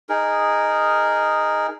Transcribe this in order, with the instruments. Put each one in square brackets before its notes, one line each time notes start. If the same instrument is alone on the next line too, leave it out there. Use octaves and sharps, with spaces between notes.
[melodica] D#4 G#4 A#4